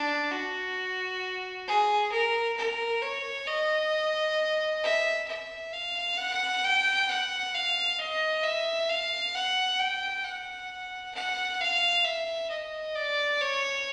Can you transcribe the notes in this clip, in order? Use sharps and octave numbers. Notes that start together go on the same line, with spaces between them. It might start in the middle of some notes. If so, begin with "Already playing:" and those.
Already playing: D4
F#4
G#4
A#4
A#4
C#5
D#5
E5
E5
F5
F#5
G5
F#5
F5
D#5
E5
F5
F#5
G5
F#5
F#5
F5
E5
D#5
D5
C#5